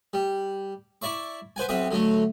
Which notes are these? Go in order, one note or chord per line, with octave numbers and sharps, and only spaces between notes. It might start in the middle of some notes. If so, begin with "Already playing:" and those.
G3
E4 D5 E5 C#6
B4 C5 F#5 G#5
B1 C4 E5 F#5 D#6
D3 F#3 A3